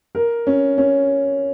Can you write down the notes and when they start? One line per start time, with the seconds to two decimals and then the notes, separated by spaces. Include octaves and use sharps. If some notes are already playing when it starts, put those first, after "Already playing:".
0.15 A#4
0.47 C#4
0.78 C#4